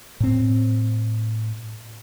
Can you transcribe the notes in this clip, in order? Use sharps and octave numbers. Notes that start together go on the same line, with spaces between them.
A2 C4